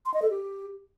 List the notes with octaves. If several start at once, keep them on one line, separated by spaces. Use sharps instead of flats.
C6
D#5
A4
G4